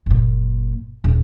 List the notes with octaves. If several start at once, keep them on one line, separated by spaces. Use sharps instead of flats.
F#1 A#2
D#1